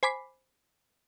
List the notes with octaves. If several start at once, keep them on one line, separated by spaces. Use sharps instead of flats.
C5 G#5 B5 D6 B6 C7